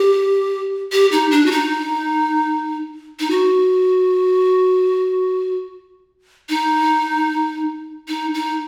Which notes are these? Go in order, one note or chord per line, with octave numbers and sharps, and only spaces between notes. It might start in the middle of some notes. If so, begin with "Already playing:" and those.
Already playing: G4
G4
D#4
D4
F#4
D#4
D#4
F#4
D#4
D#4
D#4